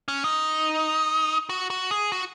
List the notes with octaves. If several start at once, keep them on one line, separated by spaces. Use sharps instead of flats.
C#4
D#4
F#4
F#4
G#4
F#4